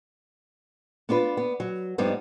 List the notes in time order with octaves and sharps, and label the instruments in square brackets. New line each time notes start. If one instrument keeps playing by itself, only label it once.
[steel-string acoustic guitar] B3 D4 F4 B4
B3
F#3
G2 F3 G3 B3 D#4